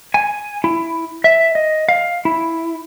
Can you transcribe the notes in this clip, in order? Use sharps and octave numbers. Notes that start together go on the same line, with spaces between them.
G#5
E4
E5
D#5
F5
E4